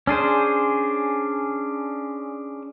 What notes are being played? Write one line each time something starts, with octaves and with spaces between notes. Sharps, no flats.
C#4 D4 G#4 C5